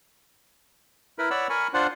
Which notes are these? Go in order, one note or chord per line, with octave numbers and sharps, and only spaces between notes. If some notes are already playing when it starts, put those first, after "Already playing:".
E4 A#4 B4 B5
C#5 D5 F#5 B5 E6
A#4 G#5 B5 C#6
D4 F4 C5 F#5